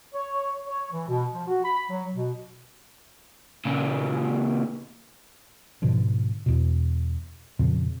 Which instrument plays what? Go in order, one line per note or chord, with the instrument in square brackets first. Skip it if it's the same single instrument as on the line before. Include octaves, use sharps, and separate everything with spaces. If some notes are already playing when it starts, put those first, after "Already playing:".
[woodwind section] C#5
C#5
E3
B2
F3
F#4
B5
F#3
B2
[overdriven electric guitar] A#2 C#3
[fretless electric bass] G#2 B2 D3 F3
E2 B2
F2 A#2 C#3 F3